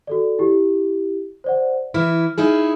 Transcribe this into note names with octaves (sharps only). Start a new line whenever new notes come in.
F#4 A4 D5
E4 G4
C5 D5 F#5
E3 E4 F6
D#4 E4 G#4